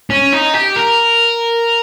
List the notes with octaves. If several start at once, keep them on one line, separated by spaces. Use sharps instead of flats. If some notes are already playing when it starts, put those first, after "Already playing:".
C#4
D#4
G4
A#4